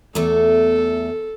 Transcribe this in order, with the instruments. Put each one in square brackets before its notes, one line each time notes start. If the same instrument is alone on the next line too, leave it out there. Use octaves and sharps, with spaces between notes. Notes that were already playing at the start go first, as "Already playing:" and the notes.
[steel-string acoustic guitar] E2 A3 [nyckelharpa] A4